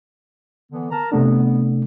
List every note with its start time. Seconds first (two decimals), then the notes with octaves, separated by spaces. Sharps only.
0.71 D3 E3 B3
0.91 A#4 A5 A#5
1.12 C3 A3 B3 D4